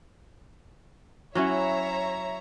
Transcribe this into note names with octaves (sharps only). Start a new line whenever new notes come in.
F#3 C#4 E4 C#5 E5 A#5